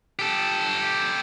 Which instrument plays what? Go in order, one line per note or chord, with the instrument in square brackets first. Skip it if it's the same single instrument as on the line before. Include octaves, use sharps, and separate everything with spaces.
[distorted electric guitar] G4 A4